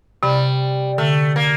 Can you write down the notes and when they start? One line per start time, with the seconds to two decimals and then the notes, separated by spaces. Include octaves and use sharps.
0.23 C3 G3
0.98 D3 A3
1.36 A#3